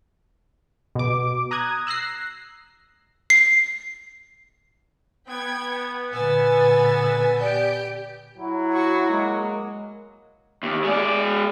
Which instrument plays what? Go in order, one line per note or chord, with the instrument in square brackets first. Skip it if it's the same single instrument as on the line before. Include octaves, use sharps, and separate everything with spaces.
[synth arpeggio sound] B2 D6
A#5 D#6 F#6 G#6
E6 F#6 A#6 C7
[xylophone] C7
[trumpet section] B3 [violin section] G5 B5 G#6
[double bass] A#2 D3 [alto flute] B4 [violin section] G#5 E6 A6
[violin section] G4 G6 D7 [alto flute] D5
[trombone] F#3 [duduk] E4
[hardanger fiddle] F#4 C#6
[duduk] G#3 [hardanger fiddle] A#3
[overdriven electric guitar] D#2
G#3 D5